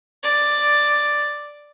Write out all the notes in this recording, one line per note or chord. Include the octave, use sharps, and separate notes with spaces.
D5